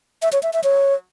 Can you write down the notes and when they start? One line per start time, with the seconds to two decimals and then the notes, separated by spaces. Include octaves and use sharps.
0.22 E5
0.33 C#5
0.43 E5
0.53 E5
0.64 C#5